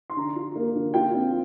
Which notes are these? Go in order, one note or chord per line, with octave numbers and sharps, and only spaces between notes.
C6
D3 A#5
F4
A#3
D3
F4 G5
C4